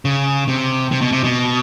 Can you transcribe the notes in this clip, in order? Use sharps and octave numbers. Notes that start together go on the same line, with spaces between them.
C#3
C3
C3
B2
C3
B2